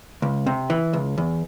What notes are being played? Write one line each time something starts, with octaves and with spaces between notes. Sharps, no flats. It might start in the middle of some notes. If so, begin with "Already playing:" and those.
C#2
C3
E3
C#2
E2